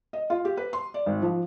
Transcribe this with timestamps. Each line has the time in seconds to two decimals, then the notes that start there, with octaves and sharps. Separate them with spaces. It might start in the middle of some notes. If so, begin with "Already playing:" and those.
0.13 D#5
0.30 F4
0.45 G4
0.57 B4
0.73 C6
0.94 D5
1.06 G#1
1.22 F3